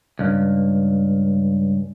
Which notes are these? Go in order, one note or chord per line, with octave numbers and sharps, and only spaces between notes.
C#2 G2